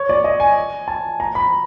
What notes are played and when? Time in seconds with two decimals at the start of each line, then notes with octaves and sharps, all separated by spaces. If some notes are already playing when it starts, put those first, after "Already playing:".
Already playing: C#5
0.09 D5
0.24 D#5
0.40 G#5
0.88 A5
1.20 A#5
1.35 B5